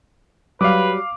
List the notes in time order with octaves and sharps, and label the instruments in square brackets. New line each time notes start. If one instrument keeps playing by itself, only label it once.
[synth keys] F#3 G3 [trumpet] B4 [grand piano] F5 D6